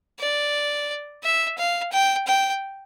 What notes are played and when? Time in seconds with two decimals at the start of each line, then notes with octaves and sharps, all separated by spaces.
0.19 D5
1.23 E5
1.58 F5
1.92 G5
2.27 G5